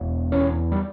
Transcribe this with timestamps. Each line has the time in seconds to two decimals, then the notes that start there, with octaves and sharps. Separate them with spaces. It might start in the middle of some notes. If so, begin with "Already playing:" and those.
Already playing: E1
0.32 E2 C#4
0.72 G3